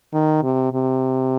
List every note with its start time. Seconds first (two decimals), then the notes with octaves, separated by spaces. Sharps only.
0.14 D#3
0.43 C3
0.73 C3